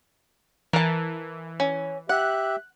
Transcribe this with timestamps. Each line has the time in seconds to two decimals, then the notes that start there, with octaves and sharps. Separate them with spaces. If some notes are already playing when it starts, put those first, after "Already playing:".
0.73 E3 A#4 A5
1.60 C#4
2.09 G4 E5 F#5 F#6